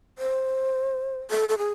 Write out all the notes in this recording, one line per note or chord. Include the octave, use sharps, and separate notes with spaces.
C5
A4
A4
G#4